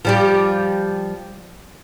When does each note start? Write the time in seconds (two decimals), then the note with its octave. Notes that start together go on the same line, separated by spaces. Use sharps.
0.05 F3 G3 G4